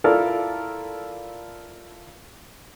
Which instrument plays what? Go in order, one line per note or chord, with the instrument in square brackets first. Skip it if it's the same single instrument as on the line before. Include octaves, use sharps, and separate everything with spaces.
[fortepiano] E4 F4 A4 A#4 D5